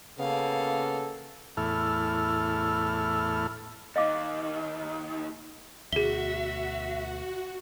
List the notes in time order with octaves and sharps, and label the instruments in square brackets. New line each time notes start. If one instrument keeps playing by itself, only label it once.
[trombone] C#3 [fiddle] A#3 F5 [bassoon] B3 [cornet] A4
[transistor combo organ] E2 A2 E4 A4 F6
[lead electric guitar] D#2 D#3 [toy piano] D#5 F5 D6
[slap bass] D2 B2 [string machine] F#4 [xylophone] G#4 G7 [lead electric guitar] E5